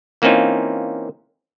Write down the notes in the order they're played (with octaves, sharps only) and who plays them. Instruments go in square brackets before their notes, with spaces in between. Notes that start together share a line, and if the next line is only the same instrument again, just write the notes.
[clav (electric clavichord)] E3 A#3 C4 C#4 D#4 F4